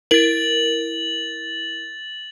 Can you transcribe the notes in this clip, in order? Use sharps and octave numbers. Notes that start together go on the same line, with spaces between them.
E4 A#4 A6 F#7